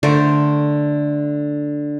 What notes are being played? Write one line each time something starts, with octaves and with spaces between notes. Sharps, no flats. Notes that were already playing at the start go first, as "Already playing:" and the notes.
D3 A3 A#4 C5